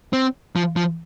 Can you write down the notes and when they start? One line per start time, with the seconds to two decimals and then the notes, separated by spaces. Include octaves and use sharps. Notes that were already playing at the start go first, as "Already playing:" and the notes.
0.13 C4
0.56 F3
0.76 F3